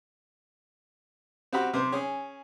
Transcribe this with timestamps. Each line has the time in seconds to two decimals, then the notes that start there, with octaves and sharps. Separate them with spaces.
1.53 C4 F#4 G4 B5
1.73 C3 C5
1.92 C#4 G#4